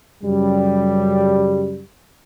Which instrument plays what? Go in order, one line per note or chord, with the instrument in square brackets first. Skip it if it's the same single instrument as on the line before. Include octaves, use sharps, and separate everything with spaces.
[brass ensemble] F#2 C#3 G3